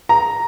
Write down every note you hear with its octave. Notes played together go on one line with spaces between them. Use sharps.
A#5